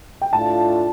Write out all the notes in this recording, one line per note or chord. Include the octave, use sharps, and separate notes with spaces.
G5
A2 A3 D4 F4 A5